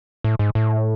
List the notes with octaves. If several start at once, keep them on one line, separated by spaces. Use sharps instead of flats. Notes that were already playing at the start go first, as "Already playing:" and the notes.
A2
G#2
A2